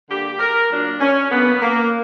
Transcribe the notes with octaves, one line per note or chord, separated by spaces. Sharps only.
D3 G3 A#3 G4
A#4
A#2 F#3 A#3 D4
C#4
D3 F#3 A#3 B3
A#3